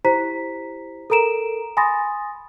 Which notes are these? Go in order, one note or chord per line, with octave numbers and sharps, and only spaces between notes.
E4 G4 C5 A#5 B6
A4 A#4 A#5 D7 E7
G#5 B5 C6 D#6 A6 A#6